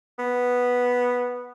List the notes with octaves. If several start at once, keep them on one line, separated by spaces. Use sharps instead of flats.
B3